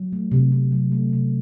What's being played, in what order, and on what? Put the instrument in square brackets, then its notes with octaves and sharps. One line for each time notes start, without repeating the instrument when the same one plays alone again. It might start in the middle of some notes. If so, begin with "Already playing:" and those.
Already playing: [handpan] F#3
A3
C3
C3
F#3
A3
C3